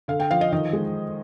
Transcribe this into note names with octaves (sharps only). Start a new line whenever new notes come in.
D3 F5
G5
F3 F5
D#5
D#3 D#5
G#3